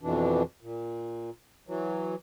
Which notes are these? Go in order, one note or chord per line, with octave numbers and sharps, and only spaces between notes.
F2 B2 E3 D4
A#2
E3 F#3